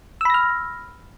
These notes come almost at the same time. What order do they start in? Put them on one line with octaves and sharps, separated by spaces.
E6 B5 A#6 F6